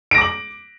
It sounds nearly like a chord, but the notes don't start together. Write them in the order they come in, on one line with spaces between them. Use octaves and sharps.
D7 A#6 D6 F#7